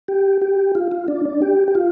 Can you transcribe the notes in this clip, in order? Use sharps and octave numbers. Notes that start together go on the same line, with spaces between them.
G4
G4
F4
F4
D4
D4
G4
G4
F4